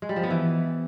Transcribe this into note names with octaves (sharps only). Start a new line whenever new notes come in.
G#3
G3
F3
B3
E3